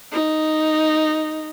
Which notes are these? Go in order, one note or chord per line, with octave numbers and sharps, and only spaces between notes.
D#4